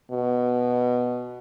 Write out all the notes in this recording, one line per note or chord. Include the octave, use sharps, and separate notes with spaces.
B2